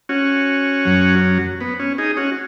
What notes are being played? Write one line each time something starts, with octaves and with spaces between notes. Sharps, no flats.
C#4 F#4
F#2 F#3
B3
C#4
D#4 G#4
C#4 F#4